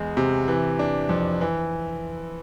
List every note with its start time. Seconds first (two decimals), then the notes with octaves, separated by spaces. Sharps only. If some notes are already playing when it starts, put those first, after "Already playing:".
Already playing: E2 G#3 G#4
0.17 C3
0.48 E3
0.79 D4
1.09 F2
1.41 E3